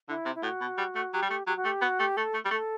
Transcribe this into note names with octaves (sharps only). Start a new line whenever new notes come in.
D3 E4
C3
E4
A2 F#4
B2
G3
A3
F#3 G4
G3
A3
F#3 G4
F#4
A3 G4
B3 F#4
A3 G4
A3 A4
A3
G3
A3 A4